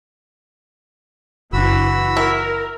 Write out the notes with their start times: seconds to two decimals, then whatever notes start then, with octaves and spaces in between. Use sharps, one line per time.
1.53 F#1 E3 D4 F#4 B5 E6
2.17 E4 A#4